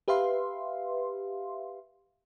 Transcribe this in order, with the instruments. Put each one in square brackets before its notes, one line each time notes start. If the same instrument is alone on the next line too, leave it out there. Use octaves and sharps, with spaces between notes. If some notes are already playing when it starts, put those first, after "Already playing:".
[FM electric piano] G4 B4 E5 F5 C6